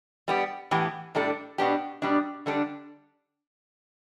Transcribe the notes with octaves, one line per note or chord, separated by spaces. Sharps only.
G3 B3 G4
A2 E3 B3 G4
A2 G3 D4 A4
B2 B3 D4 G4
B2 G3 D4
D3 G3 D4 A4